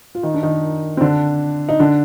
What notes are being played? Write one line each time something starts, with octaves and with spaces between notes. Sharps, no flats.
F4
D#3 D#4
D4
D#3 D#4
C4
D3 D4
D#4
D3 D4